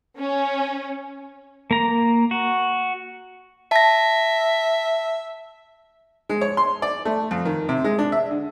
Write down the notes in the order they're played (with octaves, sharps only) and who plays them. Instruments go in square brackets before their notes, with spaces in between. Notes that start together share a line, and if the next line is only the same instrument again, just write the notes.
[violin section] C#4
[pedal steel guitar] A#3 A#5
F#4
[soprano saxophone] E5 [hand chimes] A5 A#6
[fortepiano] G#3
C#5
C6
D5
A3
F2
D#3
C3
G#3
D4
E5
D3